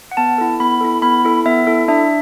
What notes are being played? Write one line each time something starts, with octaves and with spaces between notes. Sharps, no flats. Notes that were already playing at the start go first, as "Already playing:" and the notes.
F#5
B3 A5
E4 A4
B3 B5
E4 A4
B3 B5
E4 A4
B3 E5
E4 A4
D4 E5